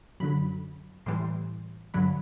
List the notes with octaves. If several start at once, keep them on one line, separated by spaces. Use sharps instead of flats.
F#2 D3 F#3 B5
A2 E3 G3 C6
G2 D3 F#3 B5